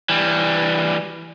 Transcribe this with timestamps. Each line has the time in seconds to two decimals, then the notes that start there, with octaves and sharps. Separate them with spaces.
0.09 E3 G3